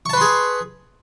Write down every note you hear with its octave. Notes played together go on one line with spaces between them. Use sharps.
G#4 B4 A5 C6 C#6